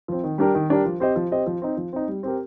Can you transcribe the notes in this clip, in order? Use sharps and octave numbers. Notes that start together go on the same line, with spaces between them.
F3 C4
D#3
G3 D4 G4 A#4
D#3
G3 D4 G4 A#4
F3
C4 G4 C5 D#5
F3
C4 G4 C5 D#5
F3
C4 D#4
F3
C4 D#4
G3
C4 G4 A#4